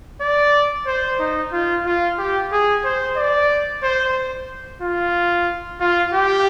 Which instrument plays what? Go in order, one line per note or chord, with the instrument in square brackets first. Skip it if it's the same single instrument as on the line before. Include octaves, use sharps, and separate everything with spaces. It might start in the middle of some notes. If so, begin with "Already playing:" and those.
[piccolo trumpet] D5
C5
D#4
F4
F4
G4
G#4
C5
D5
C5
F4
F4
G4